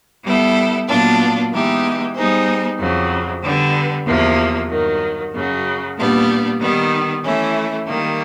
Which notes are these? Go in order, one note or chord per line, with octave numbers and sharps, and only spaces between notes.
G3 B3 E4 A4
A#2 F#3 B3 D4 F4
E3 G#3 B3 D#4 G4
G3 B3 D#4 G#4 C5
F2 C#3 F#3
D3 G3 B3
E2 C3 F3 A#3
G2 D#3 F#3
F#2 C#3 F#3
A#2 G3 B3 D4
D#3 G3 B3 D#4
E3 A3 C#4 E4
D#3 G3 A#3